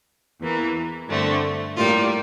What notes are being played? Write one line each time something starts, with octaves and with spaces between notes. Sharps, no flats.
E2 E3 A#3
G2 D3 A3 C4
A2 G3 A#3 F4